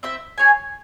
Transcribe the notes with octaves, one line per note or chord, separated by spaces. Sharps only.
C4 E4 C5 E5
G#4 C#5 G#5